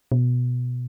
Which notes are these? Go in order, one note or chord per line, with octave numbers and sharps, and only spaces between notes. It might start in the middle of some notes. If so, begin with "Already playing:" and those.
B2